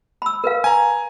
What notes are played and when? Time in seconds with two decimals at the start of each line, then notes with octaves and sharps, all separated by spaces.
0.22 B5 E6
0.44 A#4 B4 F5
0.64 G#5 A#5